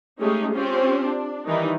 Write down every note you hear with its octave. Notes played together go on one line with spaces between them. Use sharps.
G#3 A3 C#4 D#4 G4 G#4
C4 C#4 F4 G4 C5
D4
D#3 E3 G3 D#4